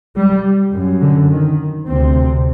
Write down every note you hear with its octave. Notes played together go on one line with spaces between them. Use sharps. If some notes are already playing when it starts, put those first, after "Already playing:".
G3
F#2
D3
D#3
D2 C3 C4